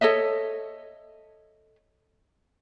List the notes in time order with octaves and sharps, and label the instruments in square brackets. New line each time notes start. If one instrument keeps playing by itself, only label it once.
[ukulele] A4 C#5 D#5 E5